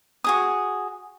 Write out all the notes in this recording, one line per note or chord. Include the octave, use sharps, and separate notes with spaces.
F#4 G#4 D#6